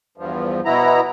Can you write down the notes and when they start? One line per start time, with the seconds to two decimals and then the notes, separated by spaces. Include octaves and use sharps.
0.18 E2 G2 F3
0.65 B2 B3 E4 A#5